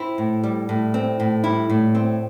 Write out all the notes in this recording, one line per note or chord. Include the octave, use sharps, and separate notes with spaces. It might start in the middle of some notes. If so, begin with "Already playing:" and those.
Already playing: C4 E4
A2
G3
A2
C4
A2
G3 E4
A2
C4